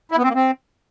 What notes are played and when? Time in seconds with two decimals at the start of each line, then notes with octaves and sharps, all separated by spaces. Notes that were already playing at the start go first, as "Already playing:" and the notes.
0.12 E4
0.17 B3
0.23 C4
0.29 A#3
0.35 C4